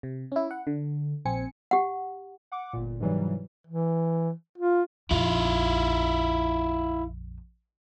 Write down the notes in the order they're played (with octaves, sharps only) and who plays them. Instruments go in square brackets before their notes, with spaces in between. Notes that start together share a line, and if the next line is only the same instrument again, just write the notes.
[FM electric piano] C3
C#4 E4
F#5
D3
A#1 C4 G#5 C#7
[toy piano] G4 F#5
[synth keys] F#5 D6
G1 A#2
G#2 C3 E3 F#3 G3
[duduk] E3
F4
[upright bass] A#1 F2 [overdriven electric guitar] E4 F4